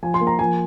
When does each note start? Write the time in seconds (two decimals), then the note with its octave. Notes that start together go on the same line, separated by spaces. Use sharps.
0.03 F3 G#5
0.14 C6
0.21 A#3
0.27 A#5
0.39 F3 G#5